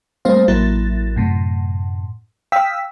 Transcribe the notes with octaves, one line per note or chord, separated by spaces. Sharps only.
G3 A3 A#3 C4 C5 F5
A1 F#3 A#3 E4 A6
F#2 A2 C3
F5 G5 D#6 E6 B6